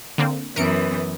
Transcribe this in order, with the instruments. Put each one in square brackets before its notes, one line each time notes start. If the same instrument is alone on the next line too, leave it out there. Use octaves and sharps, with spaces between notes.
[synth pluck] D3 A#3 C4
[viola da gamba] F#2 E3 B3 [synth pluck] A#4 C#7 D7